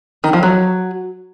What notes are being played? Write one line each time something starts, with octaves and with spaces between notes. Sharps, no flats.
D#3
F3
F#3